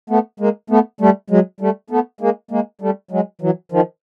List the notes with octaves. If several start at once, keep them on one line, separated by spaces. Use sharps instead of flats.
A3 B3
G#3 A#3
A3 B3
G3 A3
F#3 G#3
G3 A3
A3 B3
G#3 A#3
G#3 A#3
G3 A3
F#3 G#3
E3 F#3
D#3 F3